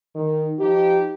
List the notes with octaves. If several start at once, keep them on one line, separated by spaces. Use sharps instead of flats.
D#3
F3 D#4 G4